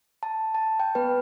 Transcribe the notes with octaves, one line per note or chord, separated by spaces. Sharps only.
A5
A5
G5
B3 B4